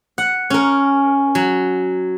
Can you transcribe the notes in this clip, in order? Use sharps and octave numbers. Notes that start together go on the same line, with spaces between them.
F#5
C#4 A#4
F#3